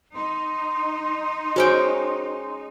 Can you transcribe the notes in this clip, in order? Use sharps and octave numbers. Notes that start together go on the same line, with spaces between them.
D#4 C6
G#3 C#4 F#4 C5 G5